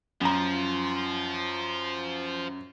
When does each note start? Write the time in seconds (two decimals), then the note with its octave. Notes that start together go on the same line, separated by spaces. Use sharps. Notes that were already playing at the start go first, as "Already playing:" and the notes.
0.21 F#2 F3 A#5